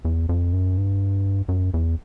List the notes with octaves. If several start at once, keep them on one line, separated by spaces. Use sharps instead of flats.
E2
F2
F#2
G2
F#2
E2